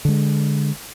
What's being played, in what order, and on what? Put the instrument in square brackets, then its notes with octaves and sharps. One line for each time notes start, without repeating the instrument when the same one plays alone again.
[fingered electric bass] D3 G#3